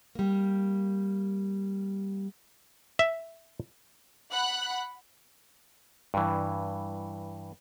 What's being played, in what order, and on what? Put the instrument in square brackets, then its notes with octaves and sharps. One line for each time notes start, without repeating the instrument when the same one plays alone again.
[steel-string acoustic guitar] G3 A#3
[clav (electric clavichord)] E5
[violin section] F#5 B5 F#6
[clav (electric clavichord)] G2 E3